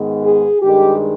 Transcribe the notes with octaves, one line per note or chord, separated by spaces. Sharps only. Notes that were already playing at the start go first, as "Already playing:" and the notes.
Already playing: G#2 D#3 G#3 B3
G#4
G2 D#3 G#3 G4